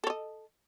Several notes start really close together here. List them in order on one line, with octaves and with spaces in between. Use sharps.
A4 C#5 D#5